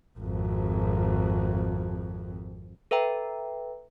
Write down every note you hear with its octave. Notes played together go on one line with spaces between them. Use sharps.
G#1 F2
A4 B4 E5 G5 A#5